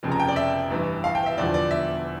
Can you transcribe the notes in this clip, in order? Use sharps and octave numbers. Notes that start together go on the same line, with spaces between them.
F1 F2 C#3
A#5
G5
D5
E5
A1 G2 E3
F5
G5
E5
E1 E2 D3 F3 D5
D5
E5